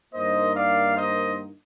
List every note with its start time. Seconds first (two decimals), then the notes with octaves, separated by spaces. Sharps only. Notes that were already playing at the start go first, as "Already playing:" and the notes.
0.14 G2 D#3 A#3 D#4 C5 D#5
0.55 D5 F5
0.96 C5 D#5